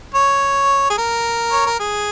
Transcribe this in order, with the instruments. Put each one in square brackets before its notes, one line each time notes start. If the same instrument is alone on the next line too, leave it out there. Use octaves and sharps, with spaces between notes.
[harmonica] C#5
G#4
A#4
C#5
A#4
G#4